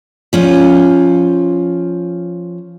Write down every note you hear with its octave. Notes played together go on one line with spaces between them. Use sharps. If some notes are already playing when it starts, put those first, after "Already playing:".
F3 C#4 F4